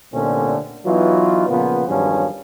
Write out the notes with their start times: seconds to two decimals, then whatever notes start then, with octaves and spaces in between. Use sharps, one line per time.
0.13 C2 A#2 D3 A3 C4 C#4
0.86 E3 F#3 B3 D#4 F4
1.49 A#2 C#3 F3 B3
1.88 E2 G2 D#3 F3 F#3 C#4